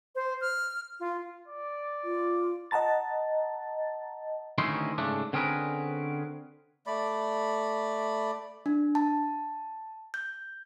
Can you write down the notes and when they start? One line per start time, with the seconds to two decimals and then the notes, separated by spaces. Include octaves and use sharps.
0.15 C5
0.41 F6
1.00 F4
1.48 D5
2.04 F4
2.71 D#5 F#5 A5 A#5 A6
4.58 D2 D#3 C#4 D#4 E4 C6
4.98 G#2 C#3 A3 D4
5.33 D3 C4 C#4 G#4 A#4 B4
6.87 A3 D5 B5
8.66 D4
8.95 A5
10.14 G6